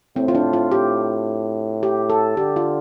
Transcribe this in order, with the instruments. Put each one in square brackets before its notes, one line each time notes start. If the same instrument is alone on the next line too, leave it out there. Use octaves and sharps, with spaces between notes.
[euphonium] A2 [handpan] C4
[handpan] F4
D4
F4
[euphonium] A2 [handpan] G4
[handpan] G4
A4
[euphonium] D3 [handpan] G4
[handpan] F4